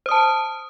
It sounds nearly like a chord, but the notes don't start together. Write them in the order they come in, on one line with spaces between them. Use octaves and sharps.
C5 D#6 A5